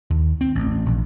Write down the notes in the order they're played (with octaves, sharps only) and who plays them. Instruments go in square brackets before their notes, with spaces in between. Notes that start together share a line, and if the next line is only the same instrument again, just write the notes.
[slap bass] D#2
C4
A1
A#1